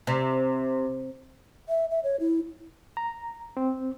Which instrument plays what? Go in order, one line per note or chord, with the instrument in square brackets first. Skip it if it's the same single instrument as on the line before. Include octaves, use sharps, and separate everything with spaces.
[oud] C3
[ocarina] E5
E5
C#5
E4
[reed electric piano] A#5
C4